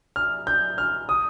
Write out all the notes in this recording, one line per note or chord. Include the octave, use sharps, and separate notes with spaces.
F6
G6
F6
D#6